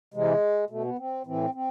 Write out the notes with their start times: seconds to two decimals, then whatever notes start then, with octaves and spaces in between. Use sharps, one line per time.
0.14 C3 E3 G#3
0.70 B2 A3
0.84 B3
0.98 C4
1.27 A2 E3 C4
1.54 C4